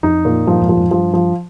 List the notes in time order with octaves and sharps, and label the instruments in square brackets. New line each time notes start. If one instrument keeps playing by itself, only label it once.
[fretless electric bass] F2 [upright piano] D#4
[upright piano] A#2
[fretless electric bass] G2 [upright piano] F3
[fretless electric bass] F2 G#2
[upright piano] F3
[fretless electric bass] F2 G#2
[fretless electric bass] G2 [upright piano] F3
[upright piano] F3